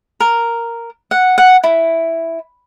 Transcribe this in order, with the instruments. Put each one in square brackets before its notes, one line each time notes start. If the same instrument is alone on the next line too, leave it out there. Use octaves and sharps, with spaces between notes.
[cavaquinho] A#4
F#5
F#5
E4